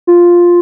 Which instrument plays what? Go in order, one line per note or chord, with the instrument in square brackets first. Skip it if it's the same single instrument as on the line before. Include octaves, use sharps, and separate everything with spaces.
[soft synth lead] F4